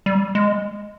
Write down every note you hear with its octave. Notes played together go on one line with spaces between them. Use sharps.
G3
G#3